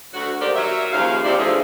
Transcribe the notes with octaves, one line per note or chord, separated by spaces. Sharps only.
D2 F#4
D#3 A#3 G4 C5 D5
F#3 A#4 E5
D#2 C#3 F3 F5
C3 F3 C4 E4 D5
D3 E3 F3 A3 G#4